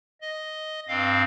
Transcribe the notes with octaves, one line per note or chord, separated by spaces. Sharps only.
D#5
G2 C4 F5